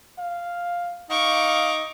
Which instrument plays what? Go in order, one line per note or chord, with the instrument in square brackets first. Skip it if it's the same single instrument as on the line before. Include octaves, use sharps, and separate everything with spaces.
[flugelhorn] F5
[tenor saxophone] D#4 [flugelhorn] F5 [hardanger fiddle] C#6 D6